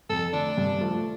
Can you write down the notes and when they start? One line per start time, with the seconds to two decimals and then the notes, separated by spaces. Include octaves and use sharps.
0.10 F2 A4
0.33 D3 A3 D4
0.58 G2
0.81 F3 A3